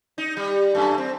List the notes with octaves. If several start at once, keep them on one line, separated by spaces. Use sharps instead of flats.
D#4
G3
F#2 A3
C4